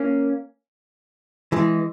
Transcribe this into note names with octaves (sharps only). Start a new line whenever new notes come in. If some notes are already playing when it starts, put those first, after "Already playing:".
Already playing: A#3 C#4
E3 G#3